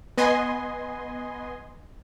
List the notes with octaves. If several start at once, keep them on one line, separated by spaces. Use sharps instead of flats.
B3 D#5 G#5 C6